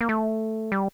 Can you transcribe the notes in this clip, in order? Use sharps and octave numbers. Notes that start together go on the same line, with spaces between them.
A#3
A3
G3